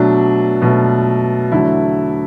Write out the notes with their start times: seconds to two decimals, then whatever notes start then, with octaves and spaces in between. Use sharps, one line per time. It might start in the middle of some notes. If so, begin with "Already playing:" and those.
Already playing: B2 F#3 A3 D4
0.62 B2 F#3 A3
1.52 E2 D3 F#3 A3 E4